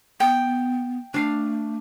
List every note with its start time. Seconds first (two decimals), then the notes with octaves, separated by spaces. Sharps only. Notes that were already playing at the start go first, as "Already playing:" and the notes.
0.20 B3 G5
1.14 A3 D4 F5